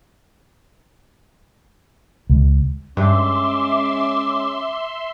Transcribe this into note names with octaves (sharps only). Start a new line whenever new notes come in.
C#2
G2 G#3 C#4 E5 C6 D6